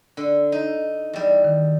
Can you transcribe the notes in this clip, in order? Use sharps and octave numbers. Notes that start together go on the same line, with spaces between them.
D3
D#4
E2 G3
D#3